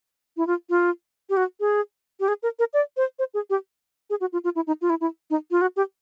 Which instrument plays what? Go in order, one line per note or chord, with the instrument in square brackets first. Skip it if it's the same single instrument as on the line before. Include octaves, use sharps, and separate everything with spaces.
[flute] E4
F4
F4
G4
F#4
G#4
G4
G#4
A#4
A#4
D5
C5
C5
G#4
G4
G#4
F#4
F4
F4
E4
D#4
F4
E4
E4
D#4
F4
F#4
G4